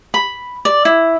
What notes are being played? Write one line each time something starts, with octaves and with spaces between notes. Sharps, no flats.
B5
D5
E4